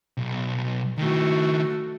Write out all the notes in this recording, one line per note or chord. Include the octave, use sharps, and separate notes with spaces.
B1
D#3 A3 E4 F#4